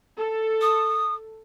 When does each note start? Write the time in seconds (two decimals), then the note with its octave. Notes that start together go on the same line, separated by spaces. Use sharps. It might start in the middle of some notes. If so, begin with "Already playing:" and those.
0.18 A4
0.62 D#6